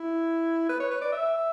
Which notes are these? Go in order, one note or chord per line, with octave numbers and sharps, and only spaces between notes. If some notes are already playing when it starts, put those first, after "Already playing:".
Already playing: E4
B4
C#5
B4
D5
E5